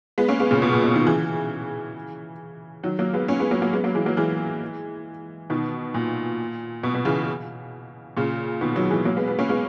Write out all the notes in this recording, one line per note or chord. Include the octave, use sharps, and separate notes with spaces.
G#3 B3
A#3 C#4
G#3 B3
A#2 C#3
B2
A#2
B2
B2 D#3
C#3 E3
D#3 F#3
F#3 A#3
G#3 B3
A#3 C#4
G#3 B3
F#3 A#3
F#3 A#3
G#3 B3
F#3 A#3
E3 G#3
F#3 A#3
E3 G#3
B2 D#3
A#2
B2
B2
C#3 E3
A#2 C#3
B2 D#3
D#3 F#3
E3 G#3
F#3 A#3
G#3 B3
G#3 B3
A#3 C#4
G#3 B3